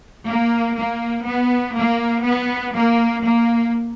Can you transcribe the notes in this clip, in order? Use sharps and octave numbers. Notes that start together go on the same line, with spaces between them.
A#3
A#3
B3
A#3
B3
A#3
A#3